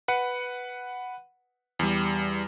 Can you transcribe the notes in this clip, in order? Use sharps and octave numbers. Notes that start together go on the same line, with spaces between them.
B4 F#5
E2 G3